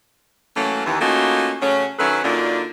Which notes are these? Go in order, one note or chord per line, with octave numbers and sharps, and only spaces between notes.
E3 F#3 A3 A#3 C#4
D#2 E3
A3 A#3 C#4 D#4 F4 F#4
C#3 F#3 A3 C#4
D#3 F#3 C#4 E4 A4 B4
F#2 D3 A#3 D4 D#4 F4